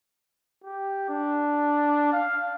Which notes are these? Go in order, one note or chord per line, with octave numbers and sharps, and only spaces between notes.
G4
D4
F5